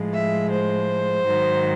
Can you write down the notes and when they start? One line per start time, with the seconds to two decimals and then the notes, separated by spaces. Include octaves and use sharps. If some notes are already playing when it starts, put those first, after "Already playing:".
Already playing: A2 F3 G#3
0.13 E5
0.51 C5
1.26 G#2 D#3 F#3